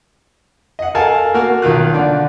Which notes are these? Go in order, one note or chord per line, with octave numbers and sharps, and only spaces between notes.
D#5 F#5
A4 A#4 F5 G#5 A5
A#3 F#4 A#4
B1 D#3 F4 F#6
D3 D5